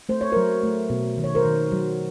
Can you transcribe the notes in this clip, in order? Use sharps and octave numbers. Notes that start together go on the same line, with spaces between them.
A3 C5
C#5
F#3 A#4 C5
A3
B2
D#3
C#5
A#4 C5
D#3
F#3